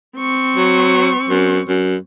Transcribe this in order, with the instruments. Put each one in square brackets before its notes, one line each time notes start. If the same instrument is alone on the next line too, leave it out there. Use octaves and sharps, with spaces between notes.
[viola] C4 C#6
[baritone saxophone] F#3
F#2
F#2